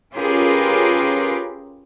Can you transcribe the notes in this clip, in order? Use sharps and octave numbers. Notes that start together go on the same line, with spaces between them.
C#4 F4 G4 G#4 A#4 B4